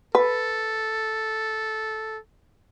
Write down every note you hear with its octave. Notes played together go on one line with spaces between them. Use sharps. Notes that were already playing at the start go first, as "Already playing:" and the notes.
A4 B4